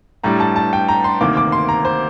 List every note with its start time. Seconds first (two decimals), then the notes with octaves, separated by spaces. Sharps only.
0.24 A2 G3 D4 A#5
0.40 A5
0.56 A5
0.73 G5
0.88 A#5
1.04 C6
1.21 D2 C3 D#3 A#3 D6
1.37 D6
1.52 C6
1.69 A#5
1.85 C5